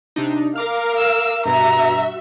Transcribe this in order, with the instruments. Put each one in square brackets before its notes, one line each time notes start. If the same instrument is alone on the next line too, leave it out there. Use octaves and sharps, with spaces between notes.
[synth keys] C3 D4 D#4
[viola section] A#4 F5 [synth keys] A#5 D6 F6
[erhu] E6
[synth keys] G2 B2 [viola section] F#4 E5 [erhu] A#5